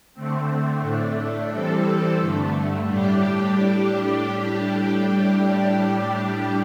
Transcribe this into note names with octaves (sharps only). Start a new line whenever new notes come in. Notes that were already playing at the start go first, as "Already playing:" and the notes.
D3 A3 C4
A2 A3 D4
E3 G3 C4 A4
G2 D3 A3
A2 G3 D4 G4